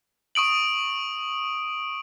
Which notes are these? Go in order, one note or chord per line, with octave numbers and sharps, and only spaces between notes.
C#6 D#6 D7 F#7